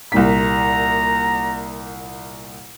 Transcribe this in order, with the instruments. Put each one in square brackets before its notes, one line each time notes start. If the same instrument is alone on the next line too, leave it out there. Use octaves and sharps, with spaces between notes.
[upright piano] C2 A#2 B6 [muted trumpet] A#5